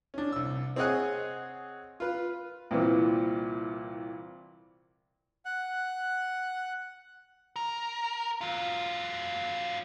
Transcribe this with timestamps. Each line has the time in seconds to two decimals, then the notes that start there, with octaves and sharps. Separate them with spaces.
0.14 C#4 D4
0.32 C2 E6
0.76 C4 G#4 C#5 D#5 F#5 G#5
2.00 F4 B4
2.71 C2 A#2 E3
5.45 F#5 F#6
7.56 A#4
8.41 F#3 F4